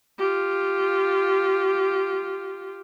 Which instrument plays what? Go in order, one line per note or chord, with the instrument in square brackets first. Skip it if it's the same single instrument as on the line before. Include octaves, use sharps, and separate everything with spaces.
[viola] F4 G4